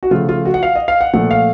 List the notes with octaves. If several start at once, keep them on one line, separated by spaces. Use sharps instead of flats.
F#4
C#3 F3 A3 F4
F4
F#4
F#5
F5
D#5
F5
F#5
A#2 F3 A3 F#5
F5